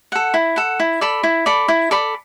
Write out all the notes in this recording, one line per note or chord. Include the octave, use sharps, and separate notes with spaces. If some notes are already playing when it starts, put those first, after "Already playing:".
A4 F#5
E4
A4 F#5
E4
A4 D5 B5
E4
A4 D5 B5
E4
A4 D5 B5